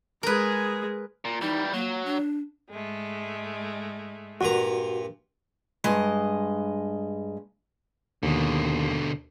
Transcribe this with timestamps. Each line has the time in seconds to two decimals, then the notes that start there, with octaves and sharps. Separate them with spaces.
0.23 G#3 G#4 A#4 B4
1.25 A#2
1.42 E3 G3 D#4
1.73 F#3 A#3
2.05 D4
2.71 G#2 G#3 A3
4.41 G2 A#2 F#4 A#5
5.84 G2 G#3 D#5
8.23 D#2 B2 D3